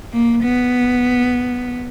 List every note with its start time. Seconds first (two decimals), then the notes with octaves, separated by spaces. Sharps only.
0.13 A#3
0.43 B3